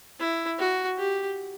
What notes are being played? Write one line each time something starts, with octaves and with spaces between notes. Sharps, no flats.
E4
F#4
G4